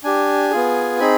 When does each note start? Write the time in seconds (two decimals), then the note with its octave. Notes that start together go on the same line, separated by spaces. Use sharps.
0.04 D4 G4 G#5
0.51 B3 F4 G#4
0.99 C4 D#4 G#4 B5